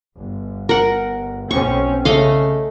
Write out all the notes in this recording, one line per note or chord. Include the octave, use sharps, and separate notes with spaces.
G1
A#4 F#5
B1 C4 C#4 C#6
C#3 A3 D#5 F5